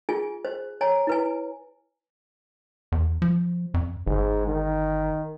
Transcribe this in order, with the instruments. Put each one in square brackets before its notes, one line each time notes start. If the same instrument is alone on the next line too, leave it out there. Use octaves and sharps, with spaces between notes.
[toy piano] F4 G#4 G#5
C5
C#5 G#5 A#5
E4 B4 G#5
[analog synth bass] E2
F3
F2
[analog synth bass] G1 [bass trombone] G#2
[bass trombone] D#3